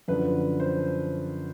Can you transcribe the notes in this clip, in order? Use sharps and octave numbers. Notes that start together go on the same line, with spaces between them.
F#2 D3 F3 B4
C5